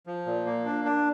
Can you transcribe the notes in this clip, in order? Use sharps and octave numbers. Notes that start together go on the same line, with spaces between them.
F3
A#2
A#3
D4
D4